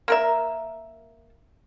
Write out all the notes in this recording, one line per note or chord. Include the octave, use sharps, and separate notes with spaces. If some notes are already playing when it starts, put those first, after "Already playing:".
A#3 A#4 E5